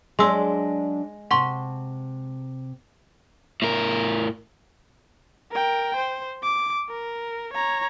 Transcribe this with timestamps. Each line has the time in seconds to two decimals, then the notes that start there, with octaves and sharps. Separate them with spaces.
0.19 F#3 G#3 D4 D5 C6 E6
1.31 C3 F#5 A5 C6 C#6
3.62 A2 A#4
5.52 A#4 G5
5.96 C5
6.43 D6
6.90 A#4
7.54 C#5 A#5